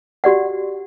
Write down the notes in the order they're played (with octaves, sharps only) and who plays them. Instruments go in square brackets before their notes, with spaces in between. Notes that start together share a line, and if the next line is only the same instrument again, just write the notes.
[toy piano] F#4 G4 D5 F#5